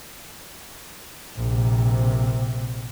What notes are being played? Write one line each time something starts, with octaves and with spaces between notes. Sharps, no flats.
A#1 C3